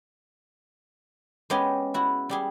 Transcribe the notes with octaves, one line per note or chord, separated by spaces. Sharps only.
G#3 B3 C#4 G4 G#4
E4 F#4
G3 G4 G#4